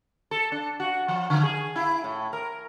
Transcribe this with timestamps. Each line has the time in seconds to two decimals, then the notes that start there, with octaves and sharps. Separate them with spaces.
0.31 A4
0.52 D4
0.80 F#4
1.08 F3
1.30 D3
1.43 G#4
1.76 E4
2.04 A2
2.33 A#4